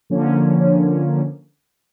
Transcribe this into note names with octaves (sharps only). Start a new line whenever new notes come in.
D3 F3 A#3 C#4